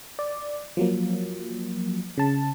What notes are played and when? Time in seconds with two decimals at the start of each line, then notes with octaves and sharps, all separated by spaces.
0.19 D5
0.77 F3 F#3 A#3
2.18 C#3 A5